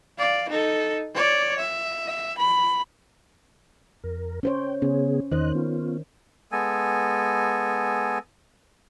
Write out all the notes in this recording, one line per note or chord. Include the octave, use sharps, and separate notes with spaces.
D5 F5
D#4 A4
C#5 D5
E5
B5
F2 A#4
C#4 C5 C#5 G5
C#3 B3 C#4 G#4
E2 D#3 C5 D#5 F#6
B3 C#4 F4
G#3 B3 A4 G#5